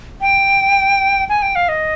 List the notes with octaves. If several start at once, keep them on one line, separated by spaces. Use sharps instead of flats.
G5
G#5
G5
F5
D#5